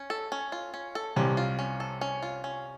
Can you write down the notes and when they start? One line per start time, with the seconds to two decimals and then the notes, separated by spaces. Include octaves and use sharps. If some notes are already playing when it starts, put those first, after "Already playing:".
Already playing: C#4
0.10 A4
0.32 C#4
0.52 F4
0.74 C#4
0.95 A4
1.16 C2 C3 C#4
1.37 F4
1.59 C#4
1.80 A4
2.01 C#4
2.23 F4
2.44 C#4